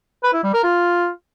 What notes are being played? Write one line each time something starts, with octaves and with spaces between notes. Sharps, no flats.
B4
E4
G3
A#4
F4